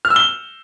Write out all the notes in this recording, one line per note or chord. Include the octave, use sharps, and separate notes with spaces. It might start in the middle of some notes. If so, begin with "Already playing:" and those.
F6
E6
G7